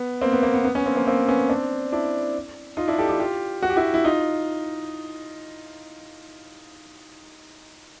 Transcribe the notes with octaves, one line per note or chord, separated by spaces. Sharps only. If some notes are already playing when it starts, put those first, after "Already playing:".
Already playing: B3
A#3 C4
B3
A#3
B3
B3
B3 C#4
A#3 C4
A#3 C4
A#3 C4
B3 C#4
C4 D4
D4 E4
D#4 F4
D4 E4
G4 A4
F4 G4
F4 G4
F#4
G4
E4 F#4
E4
D#4 F4